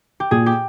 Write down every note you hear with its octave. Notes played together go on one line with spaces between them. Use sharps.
G4
A#2 G#4
G4